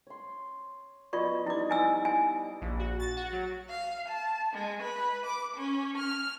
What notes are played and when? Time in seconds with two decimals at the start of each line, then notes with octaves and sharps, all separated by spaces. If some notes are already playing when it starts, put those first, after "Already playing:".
0.07 C#5 C6
1.13 B3 F4 B4 D5 D#5 C#6
1.46 G3 D#4 E4 D6
1.70 E4 G#5 E6
2.05 G#5
2.61 A#1
2.79 F#4
3.00 A6
3.17 F#4
3.32 F#3
3.70 F5
4.08 A5
4.53 G#3
4.82 B4
5.26 D6
5.57 C#4
5.98 F6